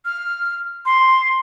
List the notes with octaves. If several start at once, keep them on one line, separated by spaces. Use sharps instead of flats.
F6
C6